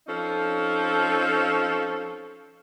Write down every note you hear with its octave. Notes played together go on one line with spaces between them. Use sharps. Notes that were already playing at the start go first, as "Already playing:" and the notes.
F3 C4 C#4 D#4 A4